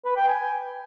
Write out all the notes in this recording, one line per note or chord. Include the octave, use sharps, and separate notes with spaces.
B4
G5
G#5